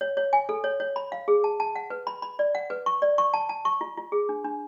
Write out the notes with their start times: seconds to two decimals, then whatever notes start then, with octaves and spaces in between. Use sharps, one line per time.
0.01 C#5
0.17 C#5
0.33 G#5
0.49 A4
0.64 C#5
0.80 C#5
0.96 B5
1.12 F5
1.28 G#4
1.44 A5
1.60 A5
1.75 F#5
1.90 B4
2.07 B5
2.22 B5
2.39 D5
2.55 F#5
2.70 B4
2.86 C#6
3.02 D5
3.18 C#6
3.34 A5
3.49 A5
3.65 C#6
3.81 F4
3.97 F4
4.12 G#4
4.29 D4
4.45 D4